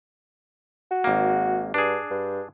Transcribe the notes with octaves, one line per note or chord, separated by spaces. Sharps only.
F#4
G#1 A#3
G2 D4 G#4
G2